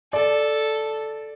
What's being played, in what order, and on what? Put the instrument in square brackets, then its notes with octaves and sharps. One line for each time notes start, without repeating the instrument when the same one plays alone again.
[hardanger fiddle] A4 [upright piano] D5